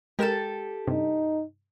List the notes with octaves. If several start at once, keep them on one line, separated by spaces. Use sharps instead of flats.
G#3 G4 A4 A#4 E7
G2 C3 D#4